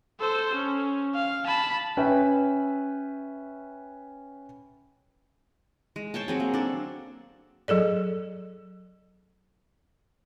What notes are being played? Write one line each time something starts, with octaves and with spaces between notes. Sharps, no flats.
A4 C5
C#4
F5
A5 B5
C#4 B4 E5 G5
G#3
C5 C#5 G5 A5
F#3 C4 G#4
A#3
D4 A4
F#3 G#4 A4 D5